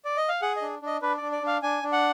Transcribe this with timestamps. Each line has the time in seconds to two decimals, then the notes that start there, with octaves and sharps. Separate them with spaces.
0.05 D5
0.17 D#5
0.29 F5
0.42 G#4 F#5
0.56 D#5
0.62 D4
0.82 D4 D#5
1.02 D4 B4
1.17 D4 D5
1.32 D5
1.42 D4 F5
1.62 D4 G#5
1.83 D4
1.92 F#5